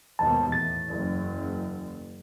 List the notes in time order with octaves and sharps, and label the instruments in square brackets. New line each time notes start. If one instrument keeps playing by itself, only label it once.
[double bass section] D#2 G#2 B2 [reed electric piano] A5
[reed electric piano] E2 A6 [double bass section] A2
[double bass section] F#1